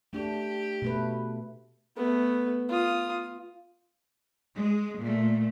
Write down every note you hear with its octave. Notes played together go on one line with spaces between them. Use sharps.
A3 D4 G4
B2 A3 B4
A3 B3
F4 D#6
G#3
A#2 A3